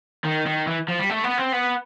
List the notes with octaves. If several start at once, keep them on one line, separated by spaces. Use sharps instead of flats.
D#3
D#3
E3
F3
G3
A3
B3
C4
B3